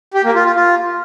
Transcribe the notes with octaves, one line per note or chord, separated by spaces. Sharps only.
G4
A#3
F4
F4
F4